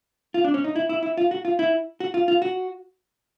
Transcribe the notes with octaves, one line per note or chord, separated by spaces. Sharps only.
F4
D4
C#4
D#4
E4
E4
E4
F4
F#4
F4
E4
F#4
F4
F4
F#4